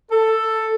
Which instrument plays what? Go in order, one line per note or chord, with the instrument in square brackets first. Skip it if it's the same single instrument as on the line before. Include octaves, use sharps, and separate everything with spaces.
[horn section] A4